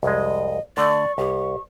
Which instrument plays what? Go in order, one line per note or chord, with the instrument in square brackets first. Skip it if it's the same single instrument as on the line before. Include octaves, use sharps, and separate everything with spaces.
[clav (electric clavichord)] C2 F2 G#3 [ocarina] D#5
[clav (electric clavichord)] D3 A3 [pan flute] D5 [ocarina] C#6
[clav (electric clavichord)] C2 [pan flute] G4